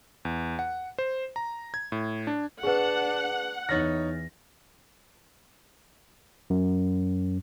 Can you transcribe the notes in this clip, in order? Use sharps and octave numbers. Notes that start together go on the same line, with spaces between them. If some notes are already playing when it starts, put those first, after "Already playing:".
E2
F#5
C5
A#5
G#6
A2
D4
D4 G#4 B4 F#5
E2 D#4 C#5 F6 A6 A#6
F#2